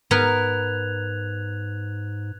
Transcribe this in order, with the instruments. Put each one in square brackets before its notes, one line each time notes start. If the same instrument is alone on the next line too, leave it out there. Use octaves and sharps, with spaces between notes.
[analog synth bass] G#2 [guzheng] B3 A#4 [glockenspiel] F#6 G#6 F7